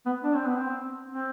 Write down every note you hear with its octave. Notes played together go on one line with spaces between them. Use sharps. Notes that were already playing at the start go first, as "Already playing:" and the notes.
B3
D4
C4
B3
C4
C4